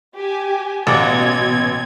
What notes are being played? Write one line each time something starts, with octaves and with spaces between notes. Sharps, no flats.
G4 G#5
A1 B2 A#3 F#5 G#6